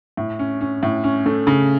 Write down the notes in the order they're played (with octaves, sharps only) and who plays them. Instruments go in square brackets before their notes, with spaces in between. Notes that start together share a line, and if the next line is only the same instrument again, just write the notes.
[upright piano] A2
C#4
C#4
A2
C#4
A3
C#3